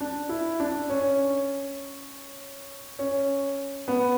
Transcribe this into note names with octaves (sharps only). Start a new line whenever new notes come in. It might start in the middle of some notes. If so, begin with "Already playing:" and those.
D4
E4
D4
C#4
C#4
B3